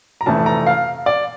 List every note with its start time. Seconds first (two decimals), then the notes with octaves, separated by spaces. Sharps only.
0.21 A#5
0.26 F1 F2 E3 A3 A5
0.46 A#5
0.67 F5
1.06 D5